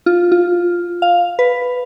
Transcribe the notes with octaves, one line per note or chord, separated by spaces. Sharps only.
F4
F4
F5
B4